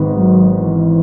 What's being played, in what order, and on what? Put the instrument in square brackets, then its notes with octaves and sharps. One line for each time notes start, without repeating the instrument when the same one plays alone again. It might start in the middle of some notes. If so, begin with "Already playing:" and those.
Already playing: [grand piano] G#1 G#2 D#3 G#3 B3
[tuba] F#3
E3